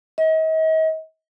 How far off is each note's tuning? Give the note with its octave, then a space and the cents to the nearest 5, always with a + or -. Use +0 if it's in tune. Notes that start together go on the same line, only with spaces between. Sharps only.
D#5 +40